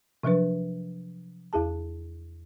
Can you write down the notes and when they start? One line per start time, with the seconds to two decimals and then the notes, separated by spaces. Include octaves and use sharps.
0.23 C3 F3 F#3 D4 B4
1.53 E2 E4 G#4 A5